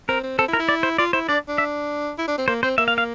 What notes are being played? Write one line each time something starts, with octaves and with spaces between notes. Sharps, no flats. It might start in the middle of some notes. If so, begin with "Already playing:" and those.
C4 A#4
C4
C4 A4
E4
A#4
E4
D5
C5
F4 D5
E4 C5
D4 D5
D4
E5
E4
D4
C4
A#3 C5
C4 C5
A#3 E5
F5
F5